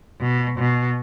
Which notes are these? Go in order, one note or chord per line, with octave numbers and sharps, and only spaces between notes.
B2
B2